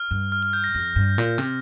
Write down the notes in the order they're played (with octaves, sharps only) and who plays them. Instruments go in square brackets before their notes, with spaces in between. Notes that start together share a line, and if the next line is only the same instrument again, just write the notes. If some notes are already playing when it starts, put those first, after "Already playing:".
Already playing: [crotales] F6
[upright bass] G2
[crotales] F6
F6
G6
A#6
[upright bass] F2 [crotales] A#6
[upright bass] G2
A#2
C3